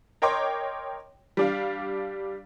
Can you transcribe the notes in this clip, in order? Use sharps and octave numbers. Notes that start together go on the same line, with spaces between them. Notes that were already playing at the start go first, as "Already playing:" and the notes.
A#4 C#5 D#5 G5 C6 D6
G3 D4 F5